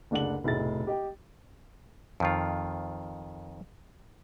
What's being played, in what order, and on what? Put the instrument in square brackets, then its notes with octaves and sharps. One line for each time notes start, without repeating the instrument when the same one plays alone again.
[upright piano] F#1 D2 D4 G#4 F#5 F#7
F1 B1 A2 G#4 E5 A6
G4 D#5 G5
[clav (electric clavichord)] F2 D#3 F4